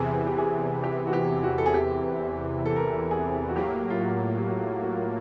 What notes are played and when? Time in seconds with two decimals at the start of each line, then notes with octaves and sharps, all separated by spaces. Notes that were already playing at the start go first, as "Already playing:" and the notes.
Already playing: E2 C3 E3 G#4
0.26 G4
0.38 G#4
0.84 G4
1.07 F#4
1.13 G4
1.43 F#4
1.58 A4
1.66 G#4
1.74 G4
2.66 A4
2.76 A#4
2.87 A4
3.11 G#4
3.49 F#4
3.56 A2 F#3 A#3 G4
3.90 F4
4.01 F#4
4.37 G4
4.47 F#4
4.83 F#4
4.93 F4